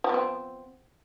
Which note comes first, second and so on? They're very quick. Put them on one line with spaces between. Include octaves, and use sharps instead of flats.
F3 B3 C4